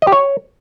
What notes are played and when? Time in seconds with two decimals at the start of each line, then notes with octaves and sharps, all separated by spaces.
0.02 D#5
0.07 G4
0.12 C#5